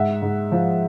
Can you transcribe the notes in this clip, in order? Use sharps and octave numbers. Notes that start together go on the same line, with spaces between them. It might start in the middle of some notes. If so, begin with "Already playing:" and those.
Already playing: G#2 E5 F#5
G#2
F3